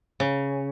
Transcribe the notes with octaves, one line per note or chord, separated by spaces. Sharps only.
C#3